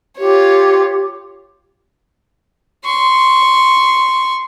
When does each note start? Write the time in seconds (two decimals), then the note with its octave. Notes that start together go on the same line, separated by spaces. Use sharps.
0.19 F4 G4 C#5
2.85 C6 C#6